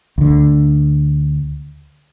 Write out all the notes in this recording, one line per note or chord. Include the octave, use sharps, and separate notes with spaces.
D2 D3